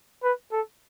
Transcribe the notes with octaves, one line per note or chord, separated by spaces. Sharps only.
B4
A4